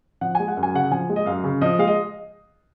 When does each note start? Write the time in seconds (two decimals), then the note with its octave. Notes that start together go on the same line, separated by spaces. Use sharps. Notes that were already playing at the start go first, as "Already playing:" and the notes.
0.21 F3 F#5
0.35 G#3 G#5
0.48 F#5
0.57 F#2
0.63 G#5
0.74 C#3 F#5
0.91 F3 G#5
1.09 G#3
1.16 D#5
1.26 F#2 F5
1.44 C#3
1.61 F3 D#5
1.79 G#3 F5
1.87 D#5